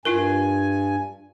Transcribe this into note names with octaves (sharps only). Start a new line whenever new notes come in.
G2 E4 F4 A#4 G#5